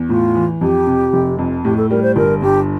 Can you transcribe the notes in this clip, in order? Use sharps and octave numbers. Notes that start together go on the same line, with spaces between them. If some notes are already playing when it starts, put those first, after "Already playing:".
Already playing: E2
A2 F4
E3
F2 G4
C3
F1
F2
A2 G4
A4
G3 A#4
C5
G1 A#4
G2 G4